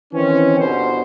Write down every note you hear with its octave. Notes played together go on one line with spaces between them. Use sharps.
D#3 E3 C4 C#4
G1 B2 C5